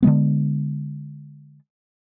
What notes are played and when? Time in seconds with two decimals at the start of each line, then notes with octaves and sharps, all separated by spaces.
0.03 D3 F3 G#3 B3